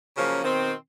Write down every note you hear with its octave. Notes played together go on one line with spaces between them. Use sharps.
C#3 F3 F#3 A#3 C#4
B2 D#3 C4